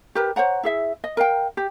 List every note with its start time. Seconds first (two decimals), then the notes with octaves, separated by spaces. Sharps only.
0.15 G4 A#4 B4
0.36 C5 C#5 F#5 A#5
0.63 E4 G#4 E5
1.04 D#5
1.17 A#4 D#5 F5 G5
1.57 G4